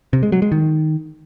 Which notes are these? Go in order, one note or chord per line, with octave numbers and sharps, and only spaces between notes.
C3
G#3
F#3
G#3
D#3